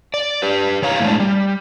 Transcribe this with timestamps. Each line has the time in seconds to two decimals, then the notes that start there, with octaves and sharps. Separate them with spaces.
0.14 D5
0.42 G4 B4
0.82 D#3 C#5 F5 A#5
1.00 A2 G#3 D4
1.20 G3